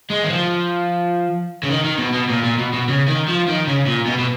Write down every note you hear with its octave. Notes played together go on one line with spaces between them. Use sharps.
G#3
D#3
F3
C#3
D#3
D#3
B2
B2
A#2
A#2
B2
B2
C#3
D#3
F3
D#3
C#3
A#2
B2
B2